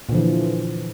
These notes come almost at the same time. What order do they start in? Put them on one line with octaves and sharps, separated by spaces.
A#2 D3 F3 E3